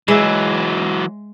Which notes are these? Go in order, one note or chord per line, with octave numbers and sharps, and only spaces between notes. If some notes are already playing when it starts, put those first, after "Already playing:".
E3 F#3 G#3 E5